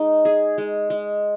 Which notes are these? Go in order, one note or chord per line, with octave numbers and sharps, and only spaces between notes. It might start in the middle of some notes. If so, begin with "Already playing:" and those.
Already playing: G#3 D#4
G#4
G#3
G#3